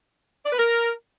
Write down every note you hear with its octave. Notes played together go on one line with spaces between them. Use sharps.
D5
B4
A#4